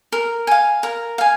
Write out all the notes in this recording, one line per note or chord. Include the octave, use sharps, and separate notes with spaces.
A#4
F5 G#5
A#4
F5 G#5